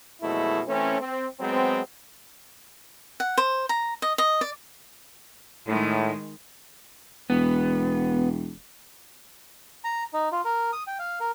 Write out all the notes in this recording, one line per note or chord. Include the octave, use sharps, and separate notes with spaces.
F2 B2 F#3 G#3 A3 E4
E3 A3 C4 C#4
C4
F#3 G#3 B3 C4
F#5
C5
A#5
D#5
D#5
D5
A2 D#3 G#3
E1 B3
A#5
D#4
F4
A#4
D#6
G5
F5
A#4